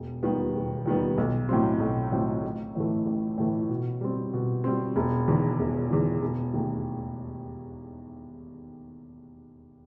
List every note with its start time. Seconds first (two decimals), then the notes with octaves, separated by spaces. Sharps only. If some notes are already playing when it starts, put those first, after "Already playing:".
Already playing: E1
0.23 D#2 D#3 G3 B3
0.55 E1
0.85 D#2 D#3 G3 B3
1.18 B1
1.49 A2 F#3 C4
1.80 B1
2.12 A2 F#3 C4
2.43 A1
2.75 A2 E3 A3
3.06 A1
3.38 A2 E3 A3
3.69 B2
4.01 G3 C4
4.33 B2
4.64 G3 C4
4.96 E1
5.28 E2 D#3
5.59 E1
5.91 E2 D#3
6.22 E1
6.54 D#2 D#3 A3